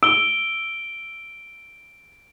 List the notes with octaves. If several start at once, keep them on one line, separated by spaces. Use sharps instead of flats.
E6 D7 G7